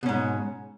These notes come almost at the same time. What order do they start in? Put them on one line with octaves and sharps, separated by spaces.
B2 C#4 G#2